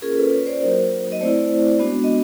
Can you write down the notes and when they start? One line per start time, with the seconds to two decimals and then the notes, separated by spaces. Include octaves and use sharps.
0.02 A#3 C#4 F4 G#4 A#4
0.17 A4 B4
0.31 B4 C#5
0.47 C5 D5
0.61 F#3 A#3 D#4 F#4 A#4 C5
1.12 D#5
1.21 A3 C4 E4 C5 D5
1.80 G#3 B3 D4 F#4
2.04 D#5